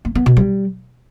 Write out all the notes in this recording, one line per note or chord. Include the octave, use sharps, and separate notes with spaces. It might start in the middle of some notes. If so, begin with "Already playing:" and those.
A#3
B3
B2
G3